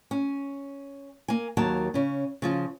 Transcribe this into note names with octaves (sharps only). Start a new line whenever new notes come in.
C#4
A#3 G#5
D#2 F#3 A#4 A5
C#3 C#4
C#3 F3 F4